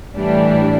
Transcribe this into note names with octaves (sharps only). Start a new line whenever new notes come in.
A2 E3 G3 D4